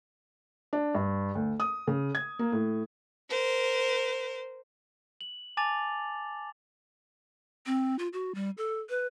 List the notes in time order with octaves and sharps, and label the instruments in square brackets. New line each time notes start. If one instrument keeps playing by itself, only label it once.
[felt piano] D4
G2
D2
D#6
C#3
G#6
A#3
A2
[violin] A#4 C5
[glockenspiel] F#7
G#5 A5 D6 A6 F7
[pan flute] C4
F4
F#4
G3
A4
B4